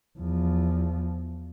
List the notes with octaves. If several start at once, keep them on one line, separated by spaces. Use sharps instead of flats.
E2 F3